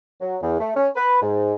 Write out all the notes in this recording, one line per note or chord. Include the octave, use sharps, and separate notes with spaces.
F#3
E2
A3
C#4
B4
G#2